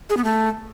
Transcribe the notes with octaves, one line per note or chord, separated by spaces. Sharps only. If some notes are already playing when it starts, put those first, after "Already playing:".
G#4
B3
A3